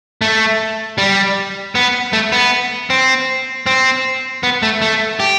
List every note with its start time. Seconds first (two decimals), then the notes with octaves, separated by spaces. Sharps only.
0.21 A3
0.98 G3
1.75 B3
2.13 A3
2.32 B3
2.90 C4
3.66 C4
4.43 B3
4.63 A3
4.82 A3
5.20 G4